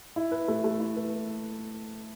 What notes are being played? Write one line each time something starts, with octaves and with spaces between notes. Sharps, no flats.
E4
B4
A3
A3
E4
B4